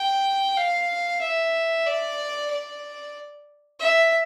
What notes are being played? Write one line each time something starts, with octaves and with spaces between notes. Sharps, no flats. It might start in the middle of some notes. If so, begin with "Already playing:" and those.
Already playing: G5
F5
E5
D5
D5
E5